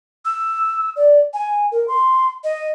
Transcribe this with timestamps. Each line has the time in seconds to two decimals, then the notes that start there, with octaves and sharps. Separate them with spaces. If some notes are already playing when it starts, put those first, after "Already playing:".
0.25 E6
0.96 D5
1.34 G#5
1.72 A#4
1.88 C6
2.44 D#5